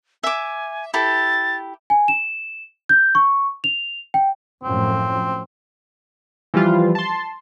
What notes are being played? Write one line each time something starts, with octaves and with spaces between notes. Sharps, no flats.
E5 G#5 D6
E4 G4 A4 A6
G#5
E7
G6
C#6
F7
G5
F#2 A2 F3 C4
E3 F3 G3 F4
A5 C6